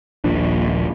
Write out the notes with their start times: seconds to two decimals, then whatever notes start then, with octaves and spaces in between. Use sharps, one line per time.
0.24 D#1 A#1 F3 D4